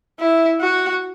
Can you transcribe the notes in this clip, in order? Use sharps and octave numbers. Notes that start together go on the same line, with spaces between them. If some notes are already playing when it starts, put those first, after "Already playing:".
E4
F#4